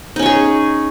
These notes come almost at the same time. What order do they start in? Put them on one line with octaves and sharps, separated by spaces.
D#4 C#4 C#5 G#4